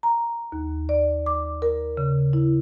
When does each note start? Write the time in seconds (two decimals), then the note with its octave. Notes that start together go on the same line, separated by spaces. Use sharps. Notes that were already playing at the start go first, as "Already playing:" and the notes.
0.03 A#5
0.52 D#2
0.89 D5
1.26 D6
1.62 A#4
1.97 C#3
2.33 E4